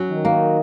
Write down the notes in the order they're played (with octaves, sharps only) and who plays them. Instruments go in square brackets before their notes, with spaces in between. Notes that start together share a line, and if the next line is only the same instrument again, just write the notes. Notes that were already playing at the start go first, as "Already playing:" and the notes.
Already playing: [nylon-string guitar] F#3 C#4
[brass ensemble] D#3
[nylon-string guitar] A#3